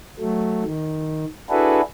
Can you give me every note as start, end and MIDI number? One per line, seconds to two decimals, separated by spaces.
0.19 0.64 54
0.19 0.64 57
0.64 1.25 51
1.50 1.81 62
1.50 1.81 64
1.50 1.81 66
1.50 1.81 68
1.50 1.81 69
1.50 1.81 71